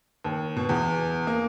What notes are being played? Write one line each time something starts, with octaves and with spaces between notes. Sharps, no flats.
D#2
B2
E2
A#3